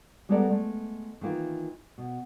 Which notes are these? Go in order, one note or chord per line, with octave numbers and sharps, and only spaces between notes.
G3 G#3 B3 A4 A#4 D5
G#3 A3
D#3 E3 A#3 F4
B2